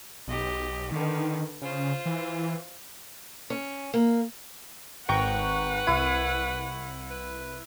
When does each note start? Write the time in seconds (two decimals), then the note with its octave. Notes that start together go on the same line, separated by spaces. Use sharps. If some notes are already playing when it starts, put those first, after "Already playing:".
0.28 B1 G4 D#5
0.92 D3 D#3 B4
1.61 C#3 F4 C5
2.06 E3
3.50 C#4
3.94 A#3
5.09 G#1 B4 F#5 G5 A#5 C#6
5.87 C2 E4 D#7
7.11 B4